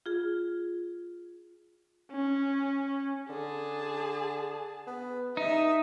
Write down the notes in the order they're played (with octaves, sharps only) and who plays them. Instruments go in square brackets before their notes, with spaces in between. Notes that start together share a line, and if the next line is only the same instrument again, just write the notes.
[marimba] F4 G#4
[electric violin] C#4
[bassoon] D3 [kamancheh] G#4 A5
[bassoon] B3
[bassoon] G2 [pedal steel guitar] D#4 [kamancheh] E5